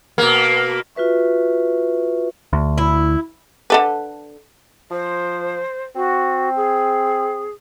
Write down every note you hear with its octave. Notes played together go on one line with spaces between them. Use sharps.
B2 A#3
F4 F#4 B4 E5 C#6
D2
E4
D3 A4 B4
F3 C5
C4 F#4
G#4